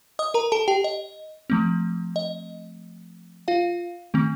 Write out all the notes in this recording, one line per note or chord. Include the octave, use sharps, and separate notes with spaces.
D#5 D#6
A#4 A#5
A4 A5
G4 G5
D#5
F3 A3 C4
D#5
F4 F5
D#3 A3 C4